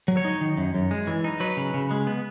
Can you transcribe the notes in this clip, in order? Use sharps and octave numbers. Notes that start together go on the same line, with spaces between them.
F#3
C#5
D#4
D#3
F#2
F#2
G#3
E3
D#4
F#3 B4
C#3
C#3
G#3
B3